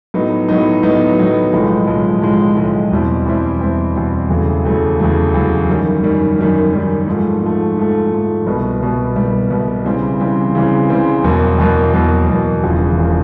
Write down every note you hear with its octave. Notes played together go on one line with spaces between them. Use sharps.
A2 F#3 B3 D#4
A2 F#3 B3 D#4
A2 F#3 B3 D#4
A2 F#3 B3 D#4
B1 A2 F3 G#3
B1 A2 F3 G#3
B1 A2 F3 G#3
B1 A2 F3 G#3
E2 B2 G3 C4 E4
E2 B2 G3 C4 E4
E2 B2 G3 C4 E4
E2 B2 G3 C4 E4
E2 C#3 F#3 A3
E2 C#3 F#3 A3
E2 C#3 F#3 A3
E2 C#3 F#3 A3
F#2 D#3 G3
F#2 D#3 G3
F#2 D#3 G3
F#2 D#3 G3
G#2 F3 A3
G#2 F3 A3
G#2 F3 A3
G#2 F3 A3
C2 B2 G3 B3
C2 B2 G3 B3
C2 B2 G3 B3
C2 B2 G3 B3
C#3 E3 G3 C4
C#3 E3 G3 C4
C#3 E3 G3 C4
C#3 E3 G3 C4
E2 B2 F#3 A#3
E2 B2 F#3 A#3
E2 B2 F#3 A#3
E2 B2 F#3 A#3
E1 E2 C#3 F3
E1 C#3 F3